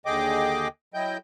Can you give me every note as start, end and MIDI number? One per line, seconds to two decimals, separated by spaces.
0.06 0.68 39
0.06 0.68 50
0.06 0.68 68
0.06 0.68 75
0.06 0.68 79
0.06 0.68 86
0.94 1.18 54
0.94 1.18 64
0.94 1.18 75
0.94 1.18 79
0.94 1.18 91